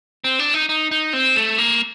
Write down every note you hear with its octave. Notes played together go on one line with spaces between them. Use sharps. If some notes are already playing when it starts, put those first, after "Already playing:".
C4
D4
D#4
D#4
D#4
C4
A3
A#3